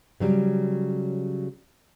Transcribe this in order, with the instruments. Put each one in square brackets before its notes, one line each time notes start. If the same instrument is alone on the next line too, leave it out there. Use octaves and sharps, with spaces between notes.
[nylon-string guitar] C#3 F#3 G3